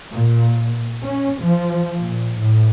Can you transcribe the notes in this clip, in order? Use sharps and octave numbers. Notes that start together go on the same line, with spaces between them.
A#2
C#4
F3
A#2
A2